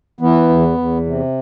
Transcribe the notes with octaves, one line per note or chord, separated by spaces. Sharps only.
E3 B3
E2
E2
C3